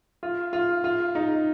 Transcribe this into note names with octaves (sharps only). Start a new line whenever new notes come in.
F4
F4
F4
D#4